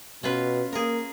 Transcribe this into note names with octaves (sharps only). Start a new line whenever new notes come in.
B2 C#4 F4 B4
A#3 G#4 A#4